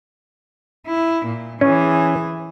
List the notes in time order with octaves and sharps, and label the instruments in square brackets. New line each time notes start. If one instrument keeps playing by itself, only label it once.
[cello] E4
A#2
[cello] E3 G#4 [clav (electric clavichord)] C#4